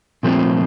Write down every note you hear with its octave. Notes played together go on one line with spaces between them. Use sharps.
A#2 F3 A3 C4